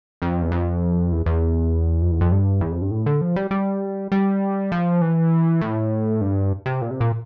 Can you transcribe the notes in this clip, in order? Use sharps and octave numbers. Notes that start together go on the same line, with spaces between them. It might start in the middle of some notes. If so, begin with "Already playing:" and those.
F2
E2
F2
E2
E2
F2
E2
F2
G2
E2
F2
G2
A2
D3
F3
G3
G3
G3
F3
E3
A2
G2
C3
A#2
C3
A#2